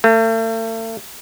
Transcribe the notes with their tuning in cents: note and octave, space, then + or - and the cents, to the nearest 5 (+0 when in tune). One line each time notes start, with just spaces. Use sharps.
A3 +40